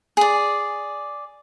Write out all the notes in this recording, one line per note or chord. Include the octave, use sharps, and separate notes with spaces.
G#4 D5